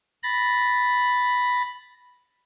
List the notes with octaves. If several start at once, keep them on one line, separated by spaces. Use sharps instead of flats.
B5 A6 A#6